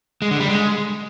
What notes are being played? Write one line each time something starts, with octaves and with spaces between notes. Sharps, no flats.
G#3
D3
G3
G#3